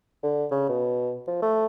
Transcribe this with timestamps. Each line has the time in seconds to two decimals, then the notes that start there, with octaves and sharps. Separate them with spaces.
0.23 D3
0.51 C#3
0.69 B2
1.27 F3
1.42 A3